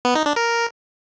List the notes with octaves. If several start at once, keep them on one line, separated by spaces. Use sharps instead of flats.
B3
D#4
D4
A#4